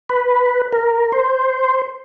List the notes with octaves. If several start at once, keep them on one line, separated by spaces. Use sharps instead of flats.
B4
A#4
C5